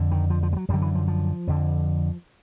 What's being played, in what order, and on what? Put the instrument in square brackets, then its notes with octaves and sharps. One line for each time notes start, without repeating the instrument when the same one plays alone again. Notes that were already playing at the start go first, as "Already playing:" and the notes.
Already playing: [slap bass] F2 D3
D#3
F3
F3
G3
F#3
F#2 D3 G3
E3
F3
F3
F2 D3